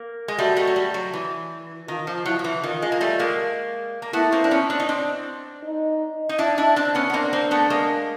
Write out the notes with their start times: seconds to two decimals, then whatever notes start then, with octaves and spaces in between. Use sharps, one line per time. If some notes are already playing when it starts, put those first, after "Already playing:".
Already playing: A#3
0.28 G#3
0.38 G3 A3 F#4
0.57 G3 A3
0.67 F#3
0.76 G3
0.94 F#3
1.13 E3
1.88 D#3 F4
2.07 F3
2.26 F#3 E4
2.39 F3
2.44 E3
2.63 D#3 F4
2.82 G#3
2.92 A#3
3.01 G3 A3
3.19 G#3 A#3
4.02 A#3
4.13 A3 B3 E4
4.32 A#3 C4
4.44 D4
4.51 B3 C#4
4.70 C4 D4
4.80 D#4
4.89 C4 D4
5.63 D#4
6.29 D#4
6.38 D4 E4
6.58 D4 E4
6.76 C4 D4
6.95 B3 C#4
7.10 B3
7.13 A#3 C4 D4
7.33 A#3 C4
7.51 A3 B3
7.70 G#3 A#3